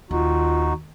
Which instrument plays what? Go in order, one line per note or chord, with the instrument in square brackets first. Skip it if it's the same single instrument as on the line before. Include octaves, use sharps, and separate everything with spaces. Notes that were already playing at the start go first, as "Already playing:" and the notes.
[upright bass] D#2 [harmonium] D#4 F#4 [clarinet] F4